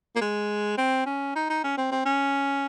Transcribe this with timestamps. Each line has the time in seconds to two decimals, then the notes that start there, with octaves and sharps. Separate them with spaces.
0.16 A#3
0.21 G#3
0.77 C4
1.06 C#4
1.36 D#4
1.50 D#4
1.64 C#4
1.77 C4
1.91 C4
2.05 C#4